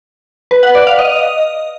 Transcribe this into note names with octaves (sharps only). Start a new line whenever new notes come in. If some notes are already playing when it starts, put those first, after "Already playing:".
B4
F#5
D5
F5
D#5